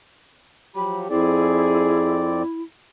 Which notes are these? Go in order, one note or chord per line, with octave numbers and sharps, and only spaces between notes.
F3 F#3 G4 B5
F2 C4 E4 G#4 D5